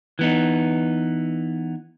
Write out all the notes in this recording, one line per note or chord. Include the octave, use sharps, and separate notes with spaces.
E3 B3 D#4